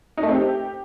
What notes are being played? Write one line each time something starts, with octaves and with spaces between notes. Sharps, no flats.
D#4
A3
C4
G4